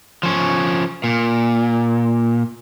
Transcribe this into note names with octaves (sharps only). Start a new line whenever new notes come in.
F3 C#4
A#2